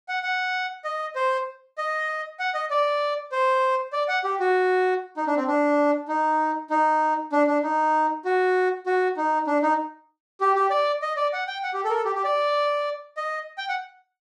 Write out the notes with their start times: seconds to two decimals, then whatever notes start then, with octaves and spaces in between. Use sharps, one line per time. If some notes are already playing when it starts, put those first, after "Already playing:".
0.09 F#5
0.23 F#5
0.84 D#5
1.15 C5
1.78 D#5
2.39 F#5
2.54 D#5
2.70 D5
3.32 C5
3.93 D5
4.08 F#5
4.24 G4
4.40 F#4
5.17 D#4
5.27 D4
5.36 C4
5.47 D4
6.08 D#4
6.70 D#4
7.32 D4
7.47 D4
7.63 D#4
8.25 F#4
8.86 F#4
9.17 D#4
9.47 D4
9.63 D#4
10.41 G4
10.55 G4
10.70 D5
11.02 D#5
11.16 D5
11.33 F#5
11.47 G5
11.63 F#5
11.74 G4
11.84 A4
11.90 A#4
11.95 A4
12.05 G4
12.15 G4
12.24 D5
13.17 D#5
13.58 G5
13.69 F#5